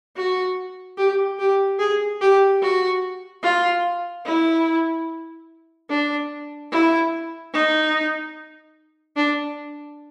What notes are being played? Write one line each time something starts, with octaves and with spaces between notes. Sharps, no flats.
F#4
G4
G4
G#4
G4
F#4
F4
E4
D4
E4
D#4
D4